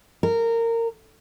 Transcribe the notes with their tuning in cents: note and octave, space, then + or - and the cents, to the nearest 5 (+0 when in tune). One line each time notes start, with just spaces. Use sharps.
A#4 -20